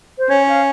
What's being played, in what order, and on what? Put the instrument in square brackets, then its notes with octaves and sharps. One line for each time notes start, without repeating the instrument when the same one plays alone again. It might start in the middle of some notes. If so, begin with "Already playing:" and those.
[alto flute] C5
[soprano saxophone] C#4 [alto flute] C#5
[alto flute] F5